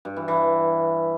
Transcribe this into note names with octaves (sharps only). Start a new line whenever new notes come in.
G2
E3
E3